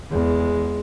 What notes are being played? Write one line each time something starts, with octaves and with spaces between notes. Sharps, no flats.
E2 G#3